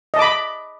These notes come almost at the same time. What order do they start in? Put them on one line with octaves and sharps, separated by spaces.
D#5 A5 D6 B5